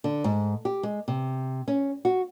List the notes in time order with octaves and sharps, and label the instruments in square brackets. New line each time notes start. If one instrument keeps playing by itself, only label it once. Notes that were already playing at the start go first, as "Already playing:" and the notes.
[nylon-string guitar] D3
G#2
G4
G#3
C3
C#4
F#4